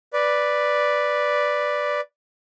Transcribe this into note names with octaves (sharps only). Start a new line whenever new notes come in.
B4 D5